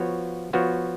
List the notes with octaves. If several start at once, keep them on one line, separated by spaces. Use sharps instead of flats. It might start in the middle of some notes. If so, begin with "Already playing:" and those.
Already playing: F3 B3 F#4 C#5
F3 B3 F#4 C#5